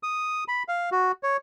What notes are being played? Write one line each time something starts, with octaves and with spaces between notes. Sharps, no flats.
D#6
B5
F5
F#4
C#5